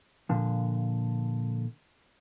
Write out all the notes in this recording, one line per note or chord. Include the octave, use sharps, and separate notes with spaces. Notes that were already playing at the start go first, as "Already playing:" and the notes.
A#2 D3 F3